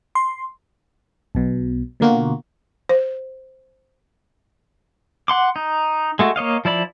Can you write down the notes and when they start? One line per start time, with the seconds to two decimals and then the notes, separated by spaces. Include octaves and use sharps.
0.15 C6
1.35 B1 B2
2.00 B2 D3 A#3 F4 F#4
2.89 C5
5.28 F#5 C6 D6
5.56 D#4
6.19 G#3 A3 F#4
6.36 A#3 C#5 D#5 F5
6.65 F3 E4 D5 B5